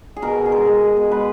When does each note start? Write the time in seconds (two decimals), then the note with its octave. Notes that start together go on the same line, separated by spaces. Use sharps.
0.16 G#4
0.22 B2 A#4
0.37 B2
0.46 G#4
0.52 G#3 A#4
0.67 G#3
0.81 B2
0.97 B2
1.11 G#3 B4